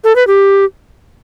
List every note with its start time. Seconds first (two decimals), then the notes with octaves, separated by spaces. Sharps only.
0.04 A4
0.16 B4
0.27 G4